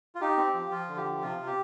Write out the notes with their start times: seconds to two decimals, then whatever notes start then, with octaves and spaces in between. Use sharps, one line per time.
0.15 F4
0.21 D#4 G4
0.37 C4
0.54 F3
0.71 F3 F4
0.88 D3
0.97 G4
1.04 F3
1.21 C3 F4
1.38 C3
1.47 G4